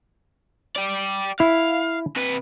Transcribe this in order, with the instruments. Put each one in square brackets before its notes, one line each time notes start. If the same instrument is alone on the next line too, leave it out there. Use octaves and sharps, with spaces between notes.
[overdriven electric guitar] G4 D5
[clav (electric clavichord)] E4 [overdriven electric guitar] F5
[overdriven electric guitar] C3 B4